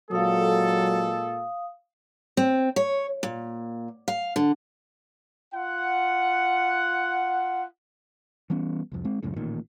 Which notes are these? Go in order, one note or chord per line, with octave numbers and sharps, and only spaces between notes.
A#2 F#3 G#3 A4 F5 D#6
C4
C#5
A#2
F5
D3
F4 F#5
E3 G3 B3 C#4
C2 F2
G#3 C4
F#1 C#2 F#2 A2
A1 A#2 D#3